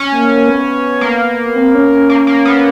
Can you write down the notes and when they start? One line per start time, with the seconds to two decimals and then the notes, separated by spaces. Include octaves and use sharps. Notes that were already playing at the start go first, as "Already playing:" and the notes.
Already playing: C#4
0.12 A#3
0.29 A#3
0.48 B3
1.01 A#3
1.46 B3
1.56 C4
1.74 C#4
1.91 C#4
2.10 A#3
2.27 A#3
2.45 B3